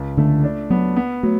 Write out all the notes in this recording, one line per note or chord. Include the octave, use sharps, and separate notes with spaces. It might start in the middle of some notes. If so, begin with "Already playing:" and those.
Already playing: C#2
D3 A3
D4
F#3 B3
B3
F#3 A3